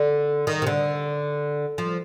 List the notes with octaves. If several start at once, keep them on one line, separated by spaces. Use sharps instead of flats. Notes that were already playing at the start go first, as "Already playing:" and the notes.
Already playing: D3
D#3
C3
D3
F3